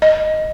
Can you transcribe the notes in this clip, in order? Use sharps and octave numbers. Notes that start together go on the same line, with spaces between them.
D#5